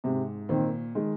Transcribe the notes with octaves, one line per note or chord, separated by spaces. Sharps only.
G#2 C3
A#2 D#3 C4
D#3 G#3